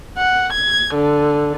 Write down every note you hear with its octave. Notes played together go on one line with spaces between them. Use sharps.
F#5
G#6
D3